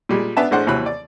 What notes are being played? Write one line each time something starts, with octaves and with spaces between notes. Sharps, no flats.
A#2 G3 G#3
B3 D4 E5 A5
A1 G#3 D4 C5 F#5
D#2 C3 E3 F#3 B5 F#6
D5